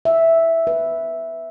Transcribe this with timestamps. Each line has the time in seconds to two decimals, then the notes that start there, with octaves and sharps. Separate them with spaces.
0.05 E5
0.67 B4